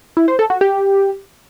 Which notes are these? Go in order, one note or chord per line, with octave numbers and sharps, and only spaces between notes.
E4
C5
A4
F#4
G4